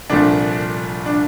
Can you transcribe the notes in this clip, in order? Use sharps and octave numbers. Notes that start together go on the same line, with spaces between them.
C2 A#2 F3 A3 D4
D4